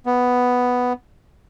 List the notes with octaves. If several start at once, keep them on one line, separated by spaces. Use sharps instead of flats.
B3